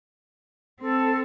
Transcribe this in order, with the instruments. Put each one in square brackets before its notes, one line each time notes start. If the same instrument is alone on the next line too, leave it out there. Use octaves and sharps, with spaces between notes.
[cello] C4 [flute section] A4